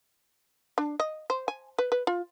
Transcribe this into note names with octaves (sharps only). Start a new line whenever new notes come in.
D4
D#5
C5
G#5
B4
B4
F4